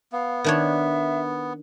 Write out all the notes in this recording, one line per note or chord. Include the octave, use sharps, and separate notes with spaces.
B3 F5
D#3 D4 C#5 E5